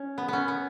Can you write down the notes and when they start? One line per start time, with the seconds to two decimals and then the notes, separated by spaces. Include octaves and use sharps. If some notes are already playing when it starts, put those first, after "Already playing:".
Already playing: C#4
0.18 B3
0.28 B3 C#4
0.48 B3